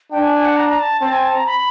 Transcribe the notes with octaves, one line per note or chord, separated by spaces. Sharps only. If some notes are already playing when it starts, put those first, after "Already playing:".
D4 G5
G#5
G#5
F#5
A#5
A#5
A5
C4 A5
G#5
A5
A#5
B5